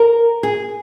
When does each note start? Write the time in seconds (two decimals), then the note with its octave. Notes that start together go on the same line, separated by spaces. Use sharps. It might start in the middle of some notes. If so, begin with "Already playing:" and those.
Already playing: A#4
0.43 G#4